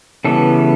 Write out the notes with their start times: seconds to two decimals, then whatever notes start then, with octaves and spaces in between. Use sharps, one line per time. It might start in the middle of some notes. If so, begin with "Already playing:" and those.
0.25 C#3 E3 G3 B3 A4